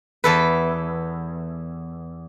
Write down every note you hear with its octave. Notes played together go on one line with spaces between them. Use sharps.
E2 A4 B4